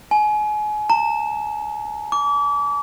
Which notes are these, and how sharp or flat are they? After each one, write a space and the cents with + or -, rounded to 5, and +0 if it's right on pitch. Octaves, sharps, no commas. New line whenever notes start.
G#5 +30
A#5 -30
D6 -35